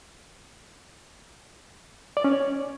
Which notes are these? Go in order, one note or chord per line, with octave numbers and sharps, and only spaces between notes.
D5
C#4
C#5